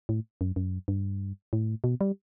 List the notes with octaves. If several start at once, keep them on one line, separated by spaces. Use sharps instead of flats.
A2
F#2
F#2
G2
A2
B2
G3